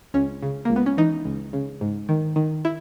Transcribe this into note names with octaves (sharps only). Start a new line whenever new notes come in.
C#2 C#4
C#3
C#2 A#3
B3
C#4
E3 D#4
C#2
C#3
G#2
D#3
D#3
E4